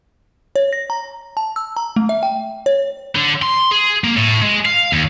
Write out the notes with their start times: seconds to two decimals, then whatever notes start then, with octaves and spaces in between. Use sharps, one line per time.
0.56 C#5
0.73 A#6
0.90 A#5
1.37 A5
1.56 E6
1.77 A#5
1.96 A3
2.09 E5
2.23 G5
2.66 C#5
3.16 D3
3.42 C6
3.71 G#4
4.04 A#3
4.17 A2
4.42 G#3
4.66 F5
4.92 D#2